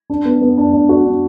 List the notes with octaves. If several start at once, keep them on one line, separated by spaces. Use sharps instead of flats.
D4
B3
B3
D4
D4
F#4
D4